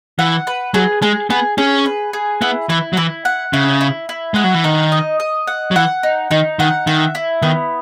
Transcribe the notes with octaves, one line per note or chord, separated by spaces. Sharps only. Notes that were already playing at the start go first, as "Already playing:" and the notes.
E3 F#5
B4
F#3 G#4
G#3 G#4
B3 G#4
C#4 G#4
B4
G#4
B3 E4
E3 E4
F#3
E3 E4
F#5
C#3 E4
E4
E4
G#3 F#5
F#3
E3
D#3 D#4
D#5
D#5
F#5
F#3
E3 F#5
D#4
D#3 D#4
D#3 F#5
D#3 E5
E4
D#3 B3